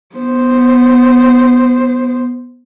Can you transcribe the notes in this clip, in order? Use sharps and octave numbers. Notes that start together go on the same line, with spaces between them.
B3 C5